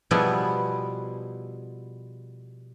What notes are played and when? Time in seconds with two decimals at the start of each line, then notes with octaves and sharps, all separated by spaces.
0.11 B2 F3 G3 B3 E4 G#4